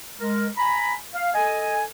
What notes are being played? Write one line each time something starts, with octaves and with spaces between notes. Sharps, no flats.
G#3 A#4
G#5 A#5 B5
F5
A4 D#5 G#5